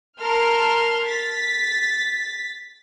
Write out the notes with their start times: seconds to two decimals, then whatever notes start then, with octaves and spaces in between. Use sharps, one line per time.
0.21 A#4 A5 C6 F6
1.06 A6 B6